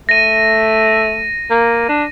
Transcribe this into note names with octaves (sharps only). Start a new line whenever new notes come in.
A3 A#6 D#7
A#3
D4